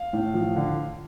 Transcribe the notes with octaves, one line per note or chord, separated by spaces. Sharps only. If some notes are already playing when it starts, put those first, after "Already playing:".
Already playing: F5
A2
F3
D3